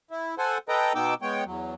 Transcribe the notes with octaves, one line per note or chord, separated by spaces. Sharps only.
E4
A4 C5 F#5 G#5
A4 B4 D#5 G5 A#5
B2 B3 D#4 G5 D6 E6
G#3 B3 C#5 G5
E2 F#3